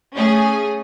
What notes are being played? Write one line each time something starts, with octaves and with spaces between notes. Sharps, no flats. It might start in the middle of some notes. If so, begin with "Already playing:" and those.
A3 C#4 G#4